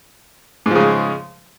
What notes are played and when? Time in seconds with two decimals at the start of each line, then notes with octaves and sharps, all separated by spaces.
0.66 G#2
0.71 F3
0.75 C#3
0.80 G#3